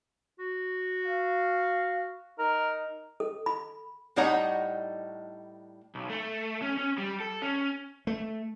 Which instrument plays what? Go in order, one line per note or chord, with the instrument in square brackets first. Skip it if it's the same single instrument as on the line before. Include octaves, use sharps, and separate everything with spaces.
[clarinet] F#4
[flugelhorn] F5
[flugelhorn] D#4 [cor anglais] A#4
[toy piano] A4
B5
[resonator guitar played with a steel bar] A2 G3 D#4 C#5 F#5 A#5
[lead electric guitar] B1
A3
C#4
C#4
G3
A4
C#4
[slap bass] A3